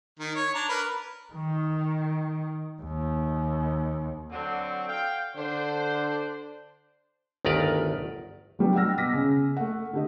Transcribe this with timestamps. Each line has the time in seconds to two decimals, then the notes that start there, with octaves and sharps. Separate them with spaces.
0.20 D#3
0.35 C#5
0.55 D4 A#5
0.69 A#4 B4
1.33 D#3
2.82 D#2
4.31 D3 F#3 C4
4.87 F5 G5
5.36 D3 D4 C5
7.45 G1 D2 D#3 A#4 B4 D5
8.59 F#3 G3 B3 D4
8.75 F#5 G5 E6 F6 A#6
8.98 B2 D6 E6 A#6 B6
9.12 C#3 G#5 E6
9.57 A3 F#5
9.93 D3 G4 D#5